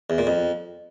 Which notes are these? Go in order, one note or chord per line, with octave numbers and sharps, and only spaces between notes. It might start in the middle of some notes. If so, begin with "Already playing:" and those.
E2
A#2
F2